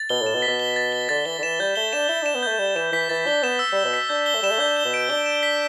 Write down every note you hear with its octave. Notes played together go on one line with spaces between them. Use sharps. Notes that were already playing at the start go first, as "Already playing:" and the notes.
Already playing: A6
B2 G7
A2 E7
B2
B6
B2
G7
A6
G7
D3 A6
E3 G7
D3
E3 E7
G3 G6
A3 G7
D4 E7
E4 G7
D4 E7
B3
A3 G6
G3 G7
E3 E7
E3 B6
E3 A6
D4 G7
B3 E7
E6
G3 G7
B2
B6
D4 G6
G7
A3
G3 E7
A3
D4 G6
G7
B2
D7
D4 G7
E7
B6